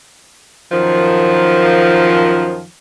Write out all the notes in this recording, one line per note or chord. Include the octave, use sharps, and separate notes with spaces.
F#2 D#3 F3